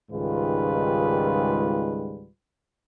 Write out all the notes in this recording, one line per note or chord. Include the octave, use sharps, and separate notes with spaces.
C#2 G#2 D#3 G3 F4 B4